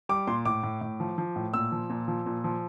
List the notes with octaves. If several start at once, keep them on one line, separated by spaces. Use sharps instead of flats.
G3 D6
A#2 C6
A2 D6
A2
A2
F3
F3
A2
A#2 E6
F3
A#2
F3
A#2
F3